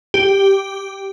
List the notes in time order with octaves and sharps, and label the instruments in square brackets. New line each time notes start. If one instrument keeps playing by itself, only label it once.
[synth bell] G4